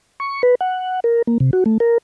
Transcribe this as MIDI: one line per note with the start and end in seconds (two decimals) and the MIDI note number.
0.20 0.42 85
0.43 0.55 71
0.61 1.00 78
1.04 1.22 70
1.27 1.38 58
1.40 1.51 48
1.53 1.64 66
1.66 1.78 57
1.80 1.98 70